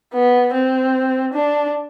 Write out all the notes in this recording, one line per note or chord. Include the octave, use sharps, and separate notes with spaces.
B3
C4
D4